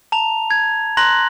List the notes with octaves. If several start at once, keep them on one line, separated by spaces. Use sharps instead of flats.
A5 A#5 F7
G#6
A#5 C6 F#6 A#6 F#7